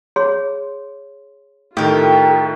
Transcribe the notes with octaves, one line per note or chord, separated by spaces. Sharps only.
G#4 C#5 C6
A2 D#3 F4 G4 A4 A#4